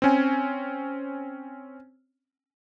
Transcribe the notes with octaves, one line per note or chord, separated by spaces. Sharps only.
C4 C#4 G#5